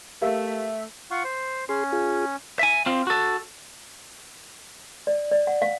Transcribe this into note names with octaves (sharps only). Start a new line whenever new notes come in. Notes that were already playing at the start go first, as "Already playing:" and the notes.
A3 G4 A#4 E5 F5
F4 F#5 C#6
C5
C#4 G#4 C6
F4 G#4
E5 G#5
C4 F4
F#4 A4
D5
D5
F#5
F5